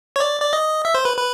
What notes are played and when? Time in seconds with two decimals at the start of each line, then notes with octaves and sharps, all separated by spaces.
0.16 C#5
0.20 D5
0.41 D5
0.53 D#5
0.85 E5
0.94 C5
1.05 B4
1.17 B4